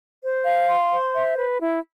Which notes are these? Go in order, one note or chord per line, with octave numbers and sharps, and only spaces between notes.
C5
F5
C6
C5
E5
B4
E4